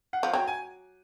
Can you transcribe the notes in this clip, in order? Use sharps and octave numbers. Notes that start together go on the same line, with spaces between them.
F#5
F3
F#3 G5
G#5